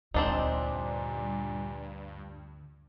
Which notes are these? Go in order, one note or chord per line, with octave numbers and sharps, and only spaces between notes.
D2 G2 A#2 C4 D4 D#4